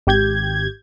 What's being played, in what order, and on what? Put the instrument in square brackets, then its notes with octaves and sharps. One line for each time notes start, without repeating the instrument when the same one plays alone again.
[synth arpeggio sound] G#1 G4 G6 G#6